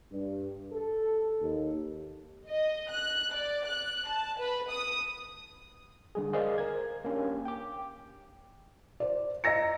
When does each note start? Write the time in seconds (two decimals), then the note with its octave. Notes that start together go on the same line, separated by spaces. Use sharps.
0.11 G2
0.72 A4
1.41 D#2
2.49 D#5
2.91 F#6
3.35 D5
3.67 F#6
4.08 A5
4.39 B4
4.71 D#6
6.15 D3 G3 G#4
6.33 G#4 A#4 C5 D5 D#5 F5
6.58 A#4 G#6
7.05 A#3 C#4 D4 G4
7.45 G5 D6
9.00 C5 D5
9.44 D#5 A#5 E6 A#6 C#7